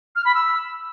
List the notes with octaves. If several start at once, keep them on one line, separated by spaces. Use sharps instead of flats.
F6
B5
E6